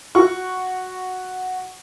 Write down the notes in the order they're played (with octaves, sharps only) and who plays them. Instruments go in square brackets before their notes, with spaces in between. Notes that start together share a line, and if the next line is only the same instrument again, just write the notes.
[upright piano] F#4 F#5 C#6